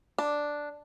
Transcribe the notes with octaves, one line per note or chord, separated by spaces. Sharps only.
D4